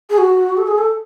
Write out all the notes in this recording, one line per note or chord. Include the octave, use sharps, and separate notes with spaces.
G#4
F#4
A4
G#4
A4